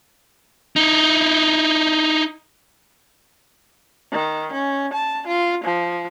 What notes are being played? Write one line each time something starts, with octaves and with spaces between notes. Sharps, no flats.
D#4 E4
D#3
C#4
A5
F4
F3